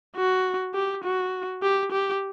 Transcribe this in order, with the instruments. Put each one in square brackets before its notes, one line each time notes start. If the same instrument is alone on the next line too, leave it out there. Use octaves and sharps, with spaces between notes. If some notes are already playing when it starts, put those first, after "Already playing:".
[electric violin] F#4
G4
F#4
G4
G4